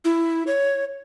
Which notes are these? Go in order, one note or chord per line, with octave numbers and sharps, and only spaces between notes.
E4
C#5